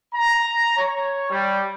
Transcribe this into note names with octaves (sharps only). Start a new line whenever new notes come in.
A#5
C#5
G3